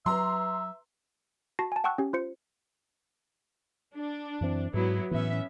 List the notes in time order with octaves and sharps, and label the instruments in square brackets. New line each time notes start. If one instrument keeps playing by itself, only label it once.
[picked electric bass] F#3 [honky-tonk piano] B4 A#5 C6 [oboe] E5
[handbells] F#4 A5 A#6 C7
G#5 A5
F#5 G5 A5 C#6 E6 F#6
C#4 G4
F4 C5 C#7
[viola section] D4
[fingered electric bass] F#2 E3 C4
[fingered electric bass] G#2 [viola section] F#3 B3 E4
[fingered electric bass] A2 E3 [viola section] B3 C#4 E5